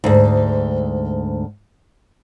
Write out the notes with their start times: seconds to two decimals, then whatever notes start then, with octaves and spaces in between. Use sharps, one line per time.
0.04 D2 G#2